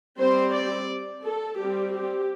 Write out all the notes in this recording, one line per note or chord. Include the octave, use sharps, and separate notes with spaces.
G3 C4 C5
D5
A4
G3 C4 G4
G4